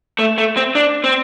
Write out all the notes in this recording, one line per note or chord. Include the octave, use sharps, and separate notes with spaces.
A3
A3
C4
D4
C4